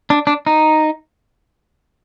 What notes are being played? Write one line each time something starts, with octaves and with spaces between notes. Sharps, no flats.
D4
D4
D#4